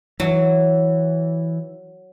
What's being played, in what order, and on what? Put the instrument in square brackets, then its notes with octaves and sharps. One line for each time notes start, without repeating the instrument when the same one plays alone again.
[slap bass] E3 [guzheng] F#3